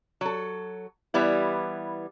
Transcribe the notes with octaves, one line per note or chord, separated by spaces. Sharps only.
F#3 A4
E3 G3 B3 E4